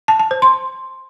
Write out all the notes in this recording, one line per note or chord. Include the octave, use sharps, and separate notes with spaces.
A5
A5
C5
C6